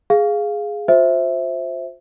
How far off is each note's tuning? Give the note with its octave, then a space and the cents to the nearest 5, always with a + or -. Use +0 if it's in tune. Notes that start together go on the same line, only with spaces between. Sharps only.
G#4 +0 F5 +0
F4 +45 C5 +0 E5 +0